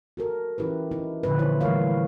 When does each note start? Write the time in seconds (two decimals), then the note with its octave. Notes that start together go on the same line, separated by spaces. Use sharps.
0.17 F#4 A4 A#4
0.58 E3 C#4 E4 G4 B4
0.91 D#4 E4
1.23 A#2 D3 F3 A#3 B4
1.39 E3 E4 C5 C#5
1.61 E3 G3 A3 A#4 C#5 F5